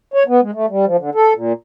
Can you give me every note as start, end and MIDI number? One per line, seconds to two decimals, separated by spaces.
0.14 0.23 73
0.28 0.41 59
0.42 0.51 56
0.54 0.66 57
0.69 0.85 55
0.86 0.97 53
0.99 1.10 50
1.15 1.33 69
1.36 1.53 46